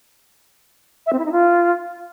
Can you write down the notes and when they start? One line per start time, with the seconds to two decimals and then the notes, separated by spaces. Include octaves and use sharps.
1.06 E5
1.13 C4
1.19 E4
1.25 D#4
1.32 F4